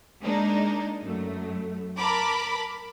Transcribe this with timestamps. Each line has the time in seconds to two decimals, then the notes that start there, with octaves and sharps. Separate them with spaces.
0.22 G#3 A#3 D4 D#4
1.03 F#2 A3
1.98 A#4 A5 B5 D6